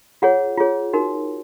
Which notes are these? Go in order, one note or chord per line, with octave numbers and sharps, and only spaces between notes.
F4 G#4 C#5 F#5
F4 G#4 C#5
D#4 F#4 A#4